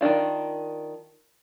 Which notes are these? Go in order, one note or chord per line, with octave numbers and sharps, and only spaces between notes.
D#3 F#3 D4 F4